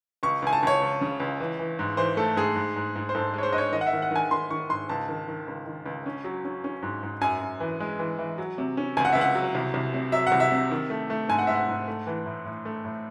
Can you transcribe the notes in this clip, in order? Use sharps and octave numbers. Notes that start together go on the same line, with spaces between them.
C#2 C#6
C#2 G#5
A5
C#2 C#5
C#2
C#3
C#2
E3
E3
G#2
E3 C5
A3 A4
G#2 G#4
G#2
G#2
G#2
C5
G#2 A4
G#3 C#5
C5
G#2 D#5
C#5
D#3 D#5
F#5
E5
D#3
F#5
D#3 G#5
D#3 C6
D#3 C#6
G#2 C6
C#2 A5
D#3
D#3
C#2
D#3
C#2
C#4
F#3
C#4
C#4
G#2
G#2
F#2 G#5
F#2
E3
G#3
E3
E3
F#3
C3
C#4
C#2 G#5
F#5
C#2 E5
F#5
F#3
C2
C2
C3
F#3 E5
F#5
C2
E5
C3
D#3
A3
A3
G#2 G#5
F#5
G#2 E5
F#5
G#2
A3
E3
A2
A2
A3
A2